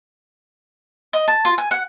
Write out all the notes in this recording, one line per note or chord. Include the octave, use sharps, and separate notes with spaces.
D#5
A5
F4
G#5
F#5